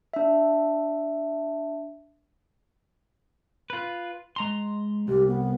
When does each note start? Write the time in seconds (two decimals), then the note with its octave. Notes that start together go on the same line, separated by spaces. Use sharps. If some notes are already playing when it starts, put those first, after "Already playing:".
0.14 D4 E5
3.70 F4 B4
4.36 G#3 A#5 C6
5.08 C2 G4
5.27 B3